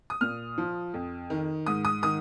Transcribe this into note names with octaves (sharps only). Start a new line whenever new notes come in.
D#6
A#2 F6
F3
F2
D#3
G#2 D#6
D#6
D#3 D#6